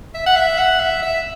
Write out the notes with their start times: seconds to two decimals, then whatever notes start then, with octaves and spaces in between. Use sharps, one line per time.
0.14 E5
0.26 F#5
0.36 E5
0.58 F#5
0.80 E5
1.02 E5